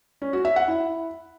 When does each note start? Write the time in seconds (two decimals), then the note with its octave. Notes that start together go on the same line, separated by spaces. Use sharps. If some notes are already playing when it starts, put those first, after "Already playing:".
0.22 C#4
0.33 F#4
0.45 E5
0.56 F#5
0.68 E4